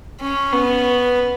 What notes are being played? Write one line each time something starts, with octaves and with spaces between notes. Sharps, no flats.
C#4
B3